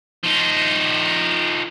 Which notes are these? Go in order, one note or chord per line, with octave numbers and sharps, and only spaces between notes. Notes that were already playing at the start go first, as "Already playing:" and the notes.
F3 D#4